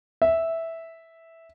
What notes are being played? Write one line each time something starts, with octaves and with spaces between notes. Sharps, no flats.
E5